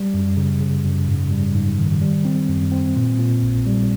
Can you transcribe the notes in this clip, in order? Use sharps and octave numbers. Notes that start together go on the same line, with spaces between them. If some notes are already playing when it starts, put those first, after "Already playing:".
Already playing: G3
F#2
C#3
C#3
F#2
G#2
G3
G#2
D#3
G3
C4
F#2
C4
A#2
A#2
A#1
G3